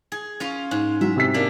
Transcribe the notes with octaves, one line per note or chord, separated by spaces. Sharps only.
G#4
C#4 F4 F5
G#2
F#3 E5
C3 E6 B6
A#3 D4